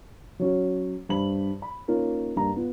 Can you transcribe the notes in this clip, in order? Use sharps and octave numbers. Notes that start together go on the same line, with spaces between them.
F#3 C#4 F#4
G2 C5 B5 F#7
B5
A#3 C#4 D#4 F4 A#4
G2 A#3 A#5
B3 F4